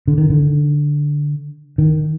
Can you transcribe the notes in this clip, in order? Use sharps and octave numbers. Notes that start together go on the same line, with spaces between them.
D3
D#3
D3
D#3